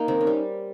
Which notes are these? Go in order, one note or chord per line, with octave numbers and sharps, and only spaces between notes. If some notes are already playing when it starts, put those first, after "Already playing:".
Already playing: A#3 D#4
D#3 C4
C#4
G3